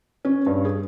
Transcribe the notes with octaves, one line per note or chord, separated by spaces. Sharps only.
C#4
G2
G#4